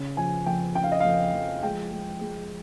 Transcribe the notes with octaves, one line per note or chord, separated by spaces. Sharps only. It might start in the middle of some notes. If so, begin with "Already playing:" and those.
Already playing: C#3
F3 G#5
F2 G5
C#3 G5
F5
D#5
F2 F5
F3
G#3 G5
G#3
G#3